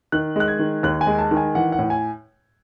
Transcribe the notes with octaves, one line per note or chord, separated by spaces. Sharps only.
D#3 F#6
G#3 F#6
G#6
D#3
D#2 F#6
G#5
G#3
A5
D#3
G#5
E3 F#5
F#5
A2
G#5